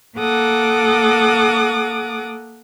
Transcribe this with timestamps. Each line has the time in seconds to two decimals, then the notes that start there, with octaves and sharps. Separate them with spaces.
0.17 A#3 A4 F#5 D6 D#6